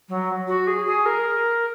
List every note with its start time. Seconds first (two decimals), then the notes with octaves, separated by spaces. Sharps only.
0.09 F#3
0.47 F#4
0.67 G#4
0.85 G#4
1.05 A#4